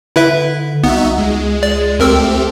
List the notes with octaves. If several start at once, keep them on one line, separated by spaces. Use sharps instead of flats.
D3 E4 B4 E5
C2 B3 D#4 F#4 E5
C#2 G#3
D5
D2 A3 C4 G4 A#4 E6